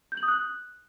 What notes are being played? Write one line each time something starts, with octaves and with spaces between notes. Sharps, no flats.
G6
F#7
D#6
F#6